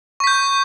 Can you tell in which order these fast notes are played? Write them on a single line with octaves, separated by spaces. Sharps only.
C#6 B6 G6